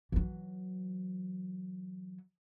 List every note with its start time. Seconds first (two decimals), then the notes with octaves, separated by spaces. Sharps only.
0.12 E3 F#3